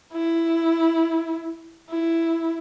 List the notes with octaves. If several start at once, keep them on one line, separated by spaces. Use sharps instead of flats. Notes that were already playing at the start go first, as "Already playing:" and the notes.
E4
E4